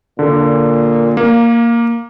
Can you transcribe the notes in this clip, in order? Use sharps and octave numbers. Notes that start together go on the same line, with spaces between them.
A#2 D3
A#3